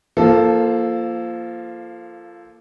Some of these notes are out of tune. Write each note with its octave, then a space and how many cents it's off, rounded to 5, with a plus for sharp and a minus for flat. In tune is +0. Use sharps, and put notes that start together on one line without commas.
F3 -20 A#3 +0 A4 +0